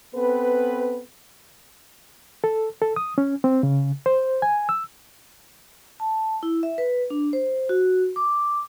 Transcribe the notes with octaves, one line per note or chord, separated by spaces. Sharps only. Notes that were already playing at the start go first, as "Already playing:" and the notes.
B3 C4 A4 B4
A4
A4
D#6
C#4
C4
C#3
C5
G#5
E6
A5
E4
E5
B4
D4
C5
F#4
D6